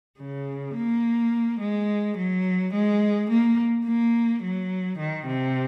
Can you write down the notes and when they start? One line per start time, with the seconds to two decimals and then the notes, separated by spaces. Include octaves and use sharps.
0.20 C#3
0.75 A#3
1.60 G#3
2.17 F#3
2.74 G#3
3.30 A#3
3.86 A#3
4.43 F#3
4.98 D#3
5.26 C3